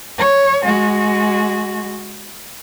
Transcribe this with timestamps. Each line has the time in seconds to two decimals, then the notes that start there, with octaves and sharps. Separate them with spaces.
0.18 C#5
0.64 G#3 F#4